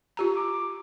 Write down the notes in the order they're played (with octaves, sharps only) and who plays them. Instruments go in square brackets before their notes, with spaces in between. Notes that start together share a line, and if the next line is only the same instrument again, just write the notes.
[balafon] F4 G4 A#5
[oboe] D6